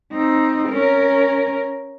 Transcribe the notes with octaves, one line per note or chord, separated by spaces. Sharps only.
C4 D#4
C#4 A#4